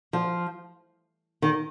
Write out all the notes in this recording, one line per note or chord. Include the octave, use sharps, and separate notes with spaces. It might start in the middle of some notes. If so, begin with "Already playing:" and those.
F3
D#3